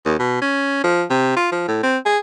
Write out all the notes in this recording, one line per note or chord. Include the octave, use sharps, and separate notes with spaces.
D#2
B2
C#4
F3
C3
F4
F3
A2
C4
G#4